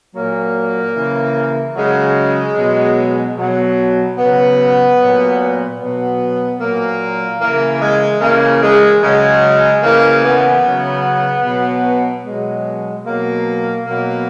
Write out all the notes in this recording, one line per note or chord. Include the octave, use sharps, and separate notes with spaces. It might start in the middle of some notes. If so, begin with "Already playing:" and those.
A#2 F#3 A#3
C#3 E3
C#3 F#3 G#3
B2 F#3
B2 F#3
C#3 F#3 B3
A#2 F#3
B2 F#3 B3
A#2 F#3 A#3
C#3 E3 A#3
G#3
C#3 E3 A#3
G#3
C#3 F#3 G#3
C#3 E3 A#3
B3
C#3 F#3
B2 F#3
B2 F#3 G#3
B2 F#3 A#3
B2 F#3 A#3